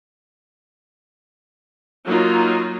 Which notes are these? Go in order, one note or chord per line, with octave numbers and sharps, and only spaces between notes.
F#3 A#3 D#4 F4